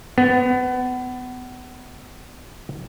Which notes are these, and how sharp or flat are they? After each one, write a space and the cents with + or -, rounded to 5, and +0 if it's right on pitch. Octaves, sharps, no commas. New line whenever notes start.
B3 +25